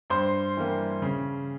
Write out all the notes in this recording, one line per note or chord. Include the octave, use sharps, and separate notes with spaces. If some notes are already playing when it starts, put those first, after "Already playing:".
G2 C5 C6
E3 G3 A#3
C#3